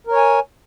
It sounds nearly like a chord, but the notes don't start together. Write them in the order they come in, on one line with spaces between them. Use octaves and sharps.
A#4 C#5 G#5